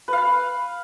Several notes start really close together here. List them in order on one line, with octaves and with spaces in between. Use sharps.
B4 F5 B5